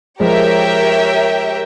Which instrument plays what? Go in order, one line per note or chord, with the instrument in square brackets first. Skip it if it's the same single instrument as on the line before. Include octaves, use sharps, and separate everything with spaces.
[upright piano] F3 G#3 [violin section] G4 A#4 C#5 E5 G5